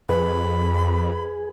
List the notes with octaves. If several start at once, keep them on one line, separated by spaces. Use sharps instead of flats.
F2 G#4 B4 B5